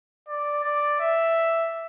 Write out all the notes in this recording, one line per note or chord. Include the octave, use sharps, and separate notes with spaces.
D5
D5
E5